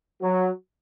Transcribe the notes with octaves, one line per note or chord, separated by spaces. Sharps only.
F#3